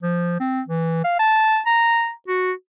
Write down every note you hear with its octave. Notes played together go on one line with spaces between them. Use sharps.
F3
C4
E3
F5
A5
A#5
F#4